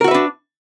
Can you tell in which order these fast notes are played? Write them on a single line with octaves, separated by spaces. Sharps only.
A#4 F#4 E5 B4 D4